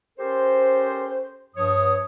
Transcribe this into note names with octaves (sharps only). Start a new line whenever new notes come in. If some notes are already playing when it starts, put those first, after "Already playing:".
C#4 G4 A4 A#4 C5
G2 F3 C#5 D#6